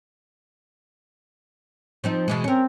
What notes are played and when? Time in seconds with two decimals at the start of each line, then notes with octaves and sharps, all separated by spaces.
2.04 F3 C4 D#4
2.28 B2 E3 G#3
2.44 C4 C#4 A#4